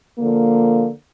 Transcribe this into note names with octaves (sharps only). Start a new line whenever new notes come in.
D3 F3 A#3